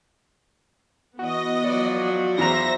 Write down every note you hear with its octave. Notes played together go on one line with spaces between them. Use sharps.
E3 B3 F#4 D#5
F3 F#3 F#4 D5
E2 C5 E5 A#5 A#6